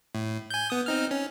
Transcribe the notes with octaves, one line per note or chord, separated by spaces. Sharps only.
A2
G#5 G6
B3 D#6
C4 D#4 F6
C#4